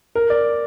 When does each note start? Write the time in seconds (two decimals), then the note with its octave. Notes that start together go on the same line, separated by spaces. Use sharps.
0.15 A#4
0.30 D5